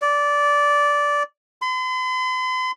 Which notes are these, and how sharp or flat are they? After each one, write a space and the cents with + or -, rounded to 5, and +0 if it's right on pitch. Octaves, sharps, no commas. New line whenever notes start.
D5 -15
C6 -45